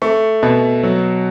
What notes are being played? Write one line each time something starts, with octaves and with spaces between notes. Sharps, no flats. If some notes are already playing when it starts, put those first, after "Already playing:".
A3 C#6
B2
F#3